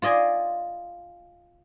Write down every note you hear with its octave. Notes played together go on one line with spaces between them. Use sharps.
F4 D5 D#5 G#5 C6